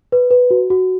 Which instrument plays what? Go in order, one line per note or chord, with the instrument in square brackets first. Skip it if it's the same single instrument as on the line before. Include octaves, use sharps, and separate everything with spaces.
[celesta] B4
B4
F#4
F#4